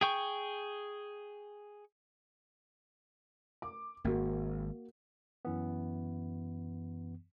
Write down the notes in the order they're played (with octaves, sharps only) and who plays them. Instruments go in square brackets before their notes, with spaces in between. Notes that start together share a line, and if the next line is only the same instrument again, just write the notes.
[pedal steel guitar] G#4 G5 C#6
[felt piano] D6
[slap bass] G#1 [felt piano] A#3 F#4
[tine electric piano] F#2 E3 B3